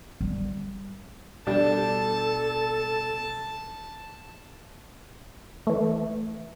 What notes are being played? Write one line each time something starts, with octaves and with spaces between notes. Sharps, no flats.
G3
B2 G3 D4 A4 A5
E3 A3